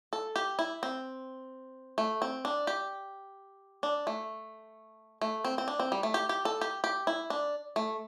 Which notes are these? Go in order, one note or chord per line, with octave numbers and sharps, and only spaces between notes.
A4
G4
E4
C4
A3
C4
D4
G4
D4
A3
A3
C4
C4
D4
C4
G3
A3
G4
G4
A4
G4
G4
E4
D4
A3